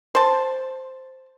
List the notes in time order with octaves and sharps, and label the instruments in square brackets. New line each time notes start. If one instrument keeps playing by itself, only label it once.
[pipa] C5 A5